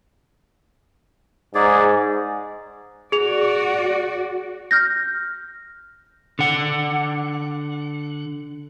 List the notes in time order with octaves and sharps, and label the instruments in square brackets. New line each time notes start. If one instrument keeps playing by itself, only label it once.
[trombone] G#2 [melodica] G#4 D5
[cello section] F#4 D5 [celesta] G#4 F7
[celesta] F6 G6 A#6
[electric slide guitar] D3 F#5